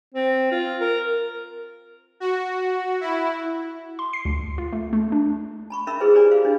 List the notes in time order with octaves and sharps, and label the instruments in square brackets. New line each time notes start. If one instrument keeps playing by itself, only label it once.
[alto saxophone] C4
F4
A#4
[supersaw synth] F#4
E4
[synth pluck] C6
C7
D2
F4
A3
A3
D4
[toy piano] A5 B5 C#6
C#4 D#4 A#4 E5 B5 E6
E4 G#4 B4 C5 G5
G4 G#4 A#4 C5 D5 G#5
C5 F5
D4 D#4